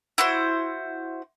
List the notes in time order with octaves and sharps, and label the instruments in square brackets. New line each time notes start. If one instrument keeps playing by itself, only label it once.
[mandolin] E4 F#4 C5